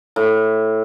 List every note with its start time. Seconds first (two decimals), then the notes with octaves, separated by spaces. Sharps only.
0.16 A2